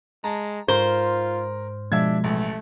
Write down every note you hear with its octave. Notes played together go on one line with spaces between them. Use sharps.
G#3 A5 A#5
G#2 F4 A#4 C5
B2 F3 G#3 D4 E5 G#6
A1 A3